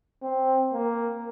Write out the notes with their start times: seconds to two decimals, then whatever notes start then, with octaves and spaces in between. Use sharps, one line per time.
0.22 C4
0.73 A#3